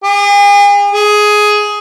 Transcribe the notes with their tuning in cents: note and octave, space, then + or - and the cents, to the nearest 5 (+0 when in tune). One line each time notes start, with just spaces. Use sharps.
G#4 -40
G#4 +10